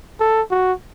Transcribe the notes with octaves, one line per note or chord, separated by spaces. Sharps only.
A4
F#4